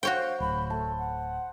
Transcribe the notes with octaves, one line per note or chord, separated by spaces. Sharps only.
F#4 C5 C#5 F5 G5
D1 B5
A3 A5
F#5